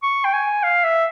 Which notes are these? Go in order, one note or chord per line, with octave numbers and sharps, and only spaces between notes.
C#6
G5
G#5
F5
E5